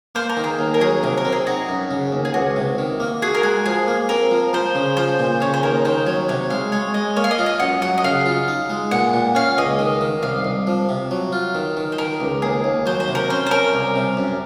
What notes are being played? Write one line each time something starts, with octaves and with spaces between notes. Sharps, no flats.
A#3 C5
A#4
D#3
G#4
D#2
A#4
F#3 G#4
C3 A#4
A#4
C4
G#4
D#4 F#4
F#2
C#3
D#2
G#4
C#2 F#4
C3
D#3
A#3
F#4 G#4
A#4
G#3 G#4
F3 G#4
A#3
C4 A#4
F3
F3 C5
C#3
F3 C5
A#2
C#3 C#5
C5
D#2 A#4
D#3 C5
F#3 C#5
C3 C#5
G#3 F5
G#3 C#5
G#3 D#5
A#3 C#5
F5
D#5
F4
D#5
F#2 F#5
F#3 F#5
D#5
C#3 F5
F4
D#4
G#3
A#2 F#5
A#2
C#4 F5
C#2 D#5
D#3
D#3
C2 F5
C2
F3
C3
F#3
F4
D#3
D#3
C5
D#3 A#4
C#2
D#2 G#4
D#2
F#3 C5
C5
C3
A#4
C#4 C5
C5
C#4 A#4
C2
C3
F#2